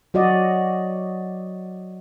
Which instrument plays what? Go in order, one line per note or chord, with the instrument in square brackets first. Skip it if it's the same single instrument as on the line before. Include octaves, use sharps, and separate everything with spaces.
[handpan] F#3 F#4 D5 D#5